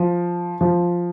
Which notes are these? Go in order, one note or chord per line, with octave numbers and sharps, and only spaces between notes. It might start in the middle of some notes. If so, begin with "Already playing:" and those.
Already playing: F3
F3